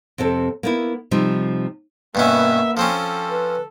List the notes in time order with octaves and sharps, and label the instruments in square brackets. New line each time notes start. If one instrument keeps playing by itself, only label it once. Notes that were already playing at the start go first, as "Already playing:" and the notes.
[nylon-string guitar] F2 C3 C4 A4
A#3 B3 E4
C3 F3 G3 D#4
[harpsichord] G2 B2 C#4 [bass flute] A#3 [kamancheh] B3 E5
[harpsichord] F3 C4 C#4 [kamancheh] A4
[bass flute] B4